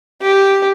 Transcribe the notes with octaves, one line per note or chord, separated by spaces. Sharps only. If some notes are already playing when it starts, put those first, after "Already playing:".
G4